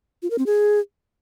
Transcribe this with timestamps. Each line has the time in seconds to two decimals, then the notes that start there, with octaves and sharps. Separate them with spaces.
0.23 F4
0.30 A#4
0.38 C4
0.46 G#4